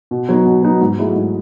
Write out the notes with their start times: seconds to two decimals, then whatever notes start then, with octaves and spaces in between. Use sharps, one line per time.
0.11 B2
0.29 F#3 B3 D#4
0.46 B2
0.63 F#3 B3 D#4
0.81 G#2
0.98 F#3 A3 E4 G#4
1.16 G#2